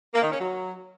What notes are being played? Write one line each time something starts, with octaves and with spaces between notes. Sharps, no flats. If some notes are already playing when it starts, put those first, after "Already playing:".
A#3
D#3
C#4
F#3